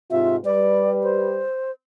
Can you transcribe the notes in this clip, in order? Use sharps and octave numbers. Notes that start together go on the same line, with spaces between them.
G#2 C3 F4 E5
G3 B4 D5
C5